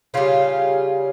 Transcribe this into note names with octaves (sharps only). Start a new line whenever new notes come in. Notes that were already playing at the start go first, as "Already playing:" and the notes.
C#3 G3 C#4 F4